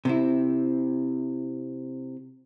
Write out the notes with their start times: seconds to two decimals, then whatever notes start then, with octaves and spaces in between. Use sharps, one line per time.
0.05 C3 C4 E4